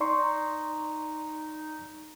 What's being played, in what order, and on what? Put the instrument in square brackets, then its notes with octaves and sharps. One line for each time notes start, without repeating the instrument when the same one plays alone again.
[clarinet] D#4 [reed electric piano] D5 C6 C#6